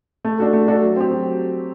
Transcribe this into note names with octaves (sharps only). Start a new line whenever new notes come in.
A3
D4 F#4 A4
A3
D4 F#4 A4
F#3
C4 G4
F#3